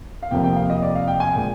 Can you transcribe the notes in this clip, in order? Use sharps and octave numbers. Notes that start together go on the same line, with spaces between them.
F5
F1 F2 C3 F3 A#3 G5
G5
F5
D#5
D5
F5
G5
G#5
A#2 G#3 G5